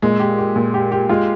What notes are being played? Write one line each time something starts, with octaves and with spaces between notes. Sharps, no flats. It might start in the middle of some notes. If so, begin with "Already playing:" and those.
A#2 G#3
G4
G4
A#2
G4
G4
G#3 F4